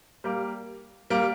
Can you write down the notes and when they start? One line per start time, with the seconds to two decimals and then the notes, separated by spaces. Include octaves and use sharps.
0.24 G3 A#3
1.10 G3 A#3